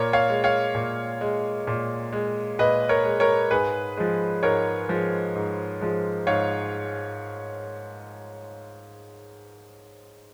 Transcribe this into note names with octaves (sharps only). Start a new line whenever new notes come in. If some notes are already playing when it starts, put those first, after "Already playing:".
Already playing: A#2 A#4 C#5
C#5 F5
G#3
C#5 F5
A#2
G#3
A#2
G#3
A#2 B4 D#5
A#4 C#5
G#3
A#4 C#5
G#2 G#4 B4
F3 G#3
G#2 A#4 C#5
F3 G#3
G#2
F3 G#3
G#2 C#5 F5